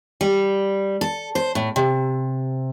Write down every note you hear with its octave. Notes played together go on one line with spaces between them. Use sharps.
G3
A4
C5
A2
C3